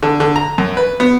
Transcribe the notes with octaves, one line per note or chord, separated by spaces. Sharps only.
D3
D3
A#5
F#2
B4
B3